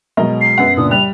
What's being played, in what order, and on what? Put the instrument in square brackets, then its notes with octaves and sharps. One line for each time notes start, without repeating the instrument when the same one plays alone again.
[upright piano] B2 A#4 D#5 [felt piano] F#3 G#3
[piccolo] C7
[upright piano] F#2 B3 F#5
[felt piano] A#2 C#3 D4 [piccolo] D#6
[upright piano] G3 [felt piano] F#6 [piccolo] F7